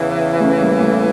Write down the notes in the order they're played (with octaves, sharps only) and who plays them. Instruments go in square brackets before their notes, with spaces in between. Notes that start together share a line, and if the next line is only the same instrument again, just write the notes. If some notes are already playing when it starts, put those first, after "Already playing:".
Already playing: [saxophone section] E2 C#3 E3
[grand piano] A3 C#4
G3 A#3
A3